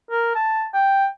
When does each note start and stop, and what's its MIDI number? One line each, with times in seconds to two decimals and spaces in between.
0.11 0.33 70
0.35 0.66 81
0.74 1.07 79